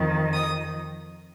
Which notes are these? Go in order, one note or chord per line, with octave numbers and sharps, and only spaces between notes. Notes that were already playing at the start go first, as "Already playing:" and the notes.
Already playing: F2 D#3
D#6